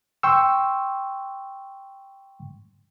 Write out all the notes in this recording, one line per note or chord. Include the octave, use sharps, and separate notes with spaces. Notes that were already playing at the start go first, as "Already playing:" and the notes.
G5 C6 C#6 E6